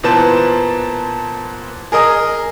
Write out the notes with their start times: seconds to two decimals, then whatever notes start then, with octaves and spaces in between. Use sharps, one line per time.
0.03 A#2 E3 B3 C5 A5
1.92 G#4 A#4 D#5 D#6